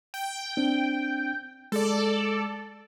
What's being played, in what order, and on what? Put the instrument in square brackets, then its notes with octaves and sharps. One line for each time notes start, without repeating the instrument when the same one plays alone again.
[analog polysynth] G5
[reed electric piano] C4 D4
[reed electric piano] G#3 [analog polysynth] A4 D5